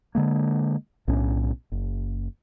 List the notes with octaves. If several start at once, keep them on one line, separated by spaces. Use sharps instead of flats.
D3 G#3 A#3
B1 A2 C#4 D4
F#1